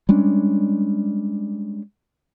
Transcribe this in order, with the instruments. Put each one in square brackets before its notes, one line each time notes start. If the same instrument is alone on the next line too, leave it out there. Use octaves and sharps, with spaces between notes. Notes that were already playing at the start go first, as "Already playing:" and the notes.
[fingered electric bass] G3 G#3 C#4 D4